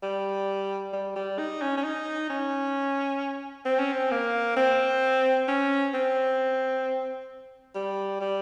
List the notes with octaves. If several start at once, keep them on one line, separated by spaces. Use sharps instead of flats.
G3
G3
G3
D#4
C#4
C#4
D#4
C#4
C4
C#4
C4
A#3
C4
C#4
C4
G3
G3